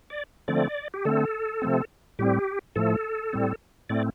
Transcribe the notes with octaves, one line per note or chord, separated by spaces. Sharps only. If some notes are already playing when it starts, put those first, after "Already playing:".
D5
D3 F3 A3 C4 D5
G4
D3 A3 C4 A4
C3 F3 A3 C4
A2 G3 C4 G4
A2 F3 A3 A4
A2 G3 C4
A2 A3 C4 D5